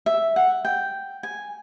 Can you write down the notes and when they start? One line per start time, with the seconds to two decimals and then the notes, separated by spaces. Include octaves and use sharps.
0.06 E5
0.36 F#5
0.65 G5
1.23 G#5